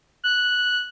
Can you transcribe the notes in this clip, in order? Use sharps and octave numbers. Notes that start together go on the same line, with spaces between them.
F#6